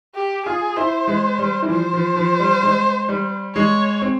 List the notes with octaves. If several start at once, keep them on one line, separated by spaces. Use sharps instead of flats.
G4
F4 G#4
E4 C5
G#3
G3
E3
F3 C5
F3
F3
G3
G#3
G3
G#3 C#5
C4